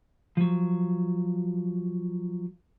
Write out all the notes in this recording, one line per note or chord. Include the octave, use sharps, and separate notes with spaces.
F3 F#3